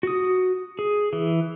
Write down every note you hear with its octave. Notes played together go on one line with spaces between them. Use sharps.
F#4 D#6
G#4
E3